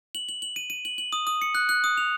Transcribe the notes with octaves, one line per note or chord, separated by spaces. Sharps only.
F#7
F#7
F#7
D#7
D#7
F#7
F#7
D#6
D#6
C#7
F#6
F#6
D#6
F7